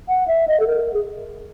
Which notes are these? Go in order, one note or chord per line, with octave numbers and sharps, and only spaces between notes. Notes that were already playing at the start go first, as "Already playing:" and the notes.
F#5
E5
D#5
A4
A#4
G#4